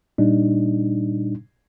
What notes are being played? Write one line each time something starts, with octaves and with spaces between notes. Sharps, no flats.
A#2 G3 D4 D#4